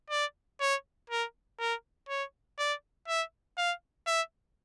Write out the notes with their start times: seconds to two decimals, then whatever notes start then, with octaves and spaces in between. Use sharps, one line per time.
0.10 D5
0.60 C#5
1.10 A#4
1.59 A#4
2.09 C#5
2.59 D5
3.08 E5
3.58 F5
4.07 E5